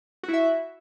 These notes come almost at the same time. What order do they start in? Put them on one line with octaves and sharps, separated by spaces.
F#4 E4 E5